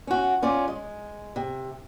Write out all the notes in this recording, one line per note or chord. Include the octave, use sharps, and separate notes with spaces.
C#4 F#4
C#4 F4 D5
G#3
C3